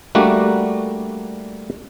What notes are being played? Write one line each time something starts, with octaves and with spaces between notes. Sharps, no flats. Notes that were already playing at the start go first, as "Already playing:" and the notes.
G3 A3 A#3 D4 F#4